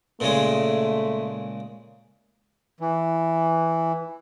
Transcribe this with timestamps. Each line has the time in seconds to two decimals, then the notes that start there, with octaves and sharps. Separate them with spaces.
0.20 A#2 C#3 G#3 A3
2.80 E3